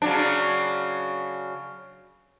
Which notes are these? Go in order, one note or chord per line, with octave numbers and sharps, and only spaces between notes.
C#3 F#3 D4